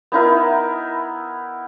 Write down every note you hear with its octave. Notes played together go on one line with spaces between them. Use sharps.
B3 D#4 E4 A#4